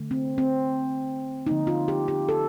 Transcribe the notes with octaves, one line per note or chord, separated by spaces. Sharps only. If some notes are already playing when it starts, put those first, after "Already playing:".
Already playing: D3 A3
C4
C4
D3 F3 A#3 D#4
F4
G4
G4
A4